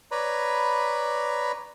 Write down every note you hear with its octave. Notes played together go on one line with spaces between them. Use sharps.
B4 C#5 D5 A#5 B5